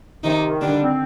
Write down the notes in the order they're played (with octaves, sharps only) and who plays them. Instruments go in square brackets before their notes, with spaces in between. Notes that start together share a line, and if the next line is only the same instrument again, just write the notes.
[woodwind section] C3 [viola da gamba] D#3 D#4
[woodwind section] D#3
[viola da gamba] D3 D4 [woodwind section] G3
[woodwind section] C4